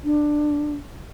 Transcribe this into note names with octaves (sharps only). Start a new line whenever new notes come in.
D4